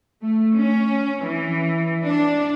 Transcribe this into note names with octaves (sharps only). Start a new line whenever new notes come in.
A3
C#4
E3
D4